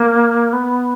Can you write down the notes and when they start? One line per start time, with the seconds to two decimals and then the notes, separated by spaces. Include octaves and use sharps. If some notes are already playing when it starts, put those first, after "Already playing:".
Already playing: A#3
0.53 B3